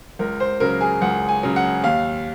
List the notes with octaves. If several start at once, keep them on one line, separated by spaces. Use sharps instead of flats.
C#2 A#4
C5
C#3 F#3 A#4
G#4
C#2 F#5
G#5
C#3 F#3
F#5
D#2 F5